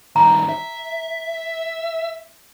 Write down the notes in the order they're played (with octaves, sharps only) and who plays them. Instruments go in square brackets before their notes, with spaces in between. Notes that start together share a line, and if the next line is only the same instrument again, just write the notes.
[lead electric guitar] G2 D#3 [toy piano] A#5
[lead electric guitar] E5